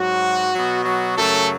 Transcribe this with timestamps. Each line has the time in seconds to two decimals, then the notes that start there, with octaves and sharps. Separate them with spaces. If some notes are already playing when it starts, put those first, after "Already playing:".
Already playing: G#2 F#3 F#4
0.52 B2 F#3
0.84 F#3 F#4
1.16 F#2 C#3 F#3 A3 A4